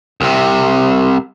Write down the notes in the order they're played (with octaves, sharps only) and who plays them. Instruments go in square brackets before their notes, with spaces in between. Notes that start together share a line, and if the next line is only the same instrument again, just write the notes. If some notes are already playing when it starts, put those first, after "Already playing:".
[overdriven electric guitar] C2 C3